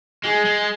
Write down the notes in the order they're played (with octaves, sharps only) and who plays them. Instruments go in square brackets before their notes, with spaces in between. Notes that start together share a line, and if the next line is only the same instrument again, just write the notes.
[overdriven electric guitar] G#3 [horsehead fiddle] G#4
[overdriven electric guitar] G#3